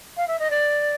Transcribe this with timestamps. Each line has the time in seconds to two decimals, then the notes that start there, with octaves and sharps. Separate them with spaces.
0.17 F5
0.27 E5
0.39 D#5
0.50 D5